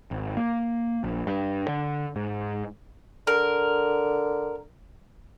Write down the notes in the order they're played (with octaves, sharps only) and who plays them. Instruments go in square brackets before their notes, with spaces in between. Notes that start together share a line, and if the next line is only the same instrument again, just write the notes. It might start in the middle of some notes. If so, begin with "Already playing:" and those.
[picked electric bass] G#1
A#3
A#1
G2
D3
G#2
[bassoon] D3 [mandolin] A#4